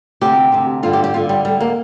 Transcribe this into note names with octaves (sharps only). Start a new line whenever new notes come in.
D2 C3 G4
D2 C3
G2 D3 F4
G4
G4
G2 D3 F4
G3
D2 D3 G3
A#3